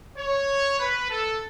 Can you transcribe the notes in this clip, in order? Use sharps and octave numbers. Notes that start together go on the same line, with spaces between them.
C#5
B4
A4